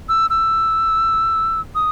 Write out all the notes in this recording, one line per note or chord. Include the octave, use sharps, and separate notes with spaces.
E6
E6
D#6